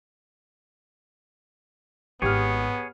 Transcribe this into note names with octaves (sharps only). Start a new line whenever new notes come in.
G#1 B3 G4 G#4 C#5 F6